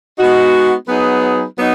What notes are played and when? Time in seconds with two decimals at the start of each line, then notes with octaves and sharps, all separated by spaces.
0.17 G#3 B3 D#4 F#4
0.87 F#3 B3 D#4 G#4 B4
1.58 F#3 B3 D#4